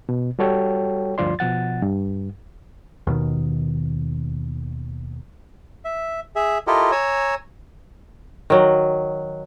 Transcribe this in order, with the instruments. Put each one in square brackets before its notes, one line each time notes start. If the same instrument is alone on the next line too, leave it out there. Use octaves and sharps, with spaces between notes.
[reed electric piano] B2
G3 F#4 A4 C#5 G5
D2 G2 F3 F4 D5 C6
B2 F3 F#5 A6
G2
[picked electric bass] D#2 B2 D#3
[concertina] E5
G#4 E5
E4 F4 G4 A4 A#4 D#5
C#5 G#5 A#5 E6
[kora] D#3 F#3